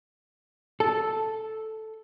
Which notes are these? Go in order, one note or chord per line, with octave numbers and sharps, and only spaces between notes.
A4